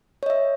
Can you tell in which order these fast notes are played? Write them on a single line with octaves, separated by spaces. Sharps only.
C#5 D#5 E5